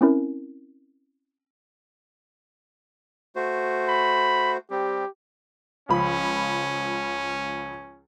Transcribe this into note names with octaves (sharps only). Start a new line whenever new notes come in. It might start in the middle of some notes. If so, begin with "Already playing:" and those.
C4 C#4 E4 A#4
A3 F#4 C5
B5
G3 C4 G4
C#2 F3 C#4 B5